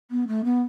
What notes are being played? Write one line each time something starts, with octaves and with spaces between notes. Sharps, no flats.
B3
A3
B3